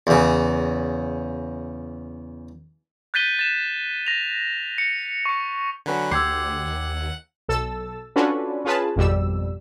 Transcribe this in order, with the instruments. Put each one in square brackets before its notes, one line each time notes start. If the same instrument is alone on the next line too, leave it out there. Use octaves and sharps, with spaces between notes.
[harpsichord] E2 C#3
[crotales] F#6 G6 A6 B6 D#7 G7
A6 E7
A#6 F7
C#7
C#6 C#7
[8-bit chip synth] D3 F#3 [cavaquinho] F#4 B4 G#5
[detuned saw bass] D2 [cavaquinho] G4 C6 D6 [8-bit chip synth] F#5 [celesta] E6 G#6 C7
[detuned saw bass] D#2
[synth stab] B1 A4 E6 A6
C#4 D4 F4 F#4 A4 B4
C#4 F4 G#4 B4 A5
G#1 F2 B2 G3 E6